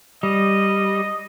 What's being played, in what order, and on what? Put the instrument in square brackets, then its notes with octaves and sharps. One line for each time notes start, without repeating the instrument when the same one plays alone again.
[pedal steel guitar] G3 [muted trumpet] D#5